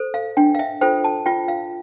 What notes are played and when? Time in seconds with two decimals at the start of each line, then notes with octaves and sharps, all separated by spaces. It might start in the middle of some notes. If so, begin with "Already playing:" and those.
Already playing: A4 C5
0.14 F5
0.37 D4 G5
0.55 F5
0.59 E5
0.81 F4 A4 C5 G5
1.04 A5
1.26 F4 G5
1.48 F5